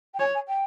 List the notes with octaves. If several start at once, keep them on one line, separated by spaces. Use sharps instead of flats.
G5
C#5 G#5
G#5
G5